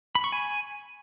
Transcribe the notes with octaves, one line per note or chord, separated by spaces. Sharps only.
B5
C#6
G#5